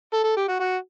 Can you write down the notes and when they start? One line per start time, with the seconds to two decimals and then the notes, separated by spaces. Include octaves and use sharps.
0.14 A4
0.24 A4
0.37 G4
0.48 F#4
0.60 F#4